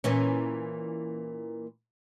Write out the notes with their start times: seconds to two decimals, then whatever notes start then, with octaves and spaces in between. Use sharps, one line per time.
0.04 A#2 E3 C#4